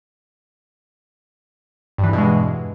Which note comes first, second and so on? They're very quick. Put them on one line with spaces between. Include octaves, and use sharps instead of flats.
G2 E3 E2 B2 G#3